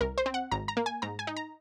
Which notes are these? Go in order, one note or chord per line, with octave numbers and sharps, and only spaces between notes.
C2 A#4
C5
C4
F#5
G#1 A#5
A#5
A#3
G#5
G#2 A#5
G#5
D#4
A#5